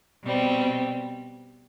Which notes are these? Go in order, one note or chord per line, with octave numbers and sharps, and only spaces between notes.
B2 G3 C4